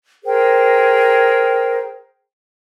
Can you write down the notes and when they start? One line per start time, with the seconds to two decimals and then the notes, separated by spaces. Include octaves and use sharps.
0.23 G#4 A#4 C5 G5